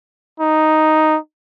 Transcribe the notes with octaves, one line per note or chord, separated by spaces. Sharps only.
D#4